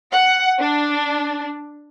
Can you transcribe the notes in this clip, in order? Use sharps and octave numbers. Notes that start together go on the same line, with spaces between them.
F#5
D4